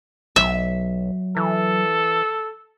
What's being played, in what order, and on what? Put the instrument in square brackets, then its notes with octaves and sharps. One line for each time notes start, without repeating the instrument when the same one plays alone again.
[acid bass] B1 [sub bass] F#3 [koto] E5
[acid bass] E3 [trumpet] A4